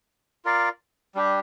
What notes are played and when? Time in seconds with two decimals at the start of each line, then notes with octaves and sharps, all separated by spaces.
0.45 F4 A#4 D5 F5
1.15 G3 D4 G4